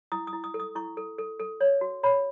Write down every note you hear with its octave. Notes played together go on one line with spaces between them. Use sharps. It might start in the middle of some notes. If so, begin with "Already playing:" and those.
E4 D#6
D#6
E4
D#6
A4
D#6
E4 C#6
A4
A4
A4
C#5
F#4
C#5 B5